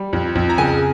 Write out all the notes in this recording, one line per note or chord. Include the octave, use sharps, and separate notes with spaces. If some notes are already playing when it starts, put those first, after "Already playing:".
Already playing: G3
F2
F2
A#5
C#3 G#5